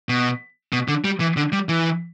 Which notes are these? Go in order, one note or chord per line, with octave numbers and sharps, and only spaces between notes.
B2
B2
D3
G3
E3
D3
G3
E3